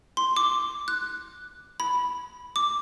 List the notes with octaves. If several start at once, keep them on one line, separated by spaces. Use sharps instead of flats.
C6
D6
F#6
B5
D6